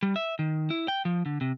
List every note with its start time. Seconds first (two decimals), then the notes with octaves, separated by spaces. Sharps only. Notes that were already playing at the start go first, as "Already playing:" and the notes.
0.03 G3
0.16 E5
0.39 D#3
0.70 E4
0.88 G5
1.05 F3
1.26 D3
1.41 C3